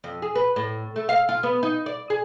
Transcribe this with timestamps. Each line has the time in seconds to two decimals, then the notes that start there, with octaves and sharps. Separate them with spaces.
0.04 F2
0.22 G#4
0.35 B4
0.56 A2
0.96 A3
1.09 F5
1.29 F4
1.43 B3
1.63 D#4
1.86 D5
2.10 G#4